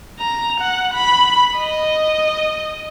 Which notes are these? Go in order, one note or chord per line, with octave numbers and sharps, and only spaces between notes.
A#5
F#5
B5
D#5